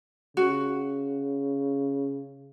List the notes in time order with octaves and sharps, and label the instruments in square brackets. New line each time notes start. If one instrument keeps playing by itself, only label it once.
[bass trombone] C#3 [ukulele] F#4